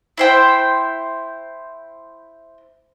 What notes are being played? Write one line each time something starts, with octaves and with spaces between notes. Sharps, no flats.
E4 C5 G5